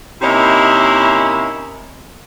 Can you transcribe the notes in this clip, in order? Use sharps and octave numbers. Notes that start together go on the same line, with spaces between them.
C3 A#3 C#4 D#4 E4